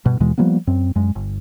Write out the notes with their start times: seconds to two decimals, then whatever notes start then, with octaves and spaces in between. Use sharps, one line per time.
0.05 G2 B2
0.20 D#2 B2 E3 G#3
0.38 F3 G3 A#3 B3
0.67 F#2 C4
0.95 F#2 G#3
1.16 G1